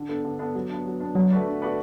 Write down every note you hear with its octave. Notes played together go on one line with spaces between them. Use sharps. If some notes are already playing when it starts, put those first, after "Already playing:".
Already playing: D3
B3 D4 A4
D3
B3 D4 A4
F#3
B3 D4
F#3
B3 D4
D3 F#3
A3 F#4 B4 D5
D3
A3 F#4 B4 D5